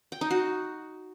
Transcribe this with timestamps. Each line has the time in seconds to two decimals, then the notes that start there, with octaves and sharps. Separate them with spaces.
0.12 G5
0.21 D#4
0.30 F#4